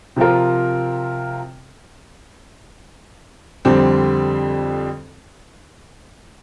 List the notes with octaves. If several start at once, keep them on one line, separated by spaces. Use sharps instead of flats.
C3 F3 C4 F4 A#4
F2 D3 G3 C4 G4